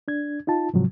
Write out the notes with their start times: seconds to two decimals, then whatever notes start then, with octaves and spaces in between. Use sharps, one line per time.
0.08 D4 G#6
0.47 D#4 F4 A5
0.74 G#2 C3 F3 F#3